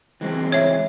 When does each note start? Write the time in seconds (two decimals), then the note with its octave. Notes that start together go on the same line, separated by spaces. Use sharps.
0.21 E3 G#3 C4
0.52 C#5 E5